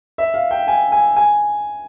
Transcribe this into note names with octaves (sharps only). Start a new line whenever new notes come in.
E5
F5
G5
G#5
G#5
G#5